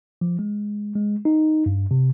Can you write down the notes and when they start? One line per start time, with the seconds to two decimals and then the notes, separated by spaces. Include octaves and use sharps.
0.21 F3
0.39 G#3
0.95 G#3
1.25 D#4
1.66 G2
1.91 C3